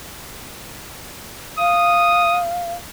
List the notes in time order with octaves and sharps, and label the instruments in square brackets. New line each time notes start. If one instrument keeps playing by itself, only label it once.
[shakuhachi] F5 [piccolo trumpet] D#6